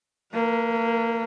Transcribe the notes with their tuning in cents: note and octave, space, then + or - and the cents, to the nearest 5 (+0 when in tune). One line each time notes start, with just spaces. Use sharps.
A#3 -25 A#4 +45